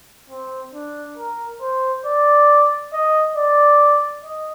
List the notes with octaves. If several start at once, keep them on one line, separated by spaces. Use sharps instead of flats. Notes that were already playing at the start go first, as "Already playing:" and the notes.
C4
D4
A#4
C5
D5
D#5
D5
D#5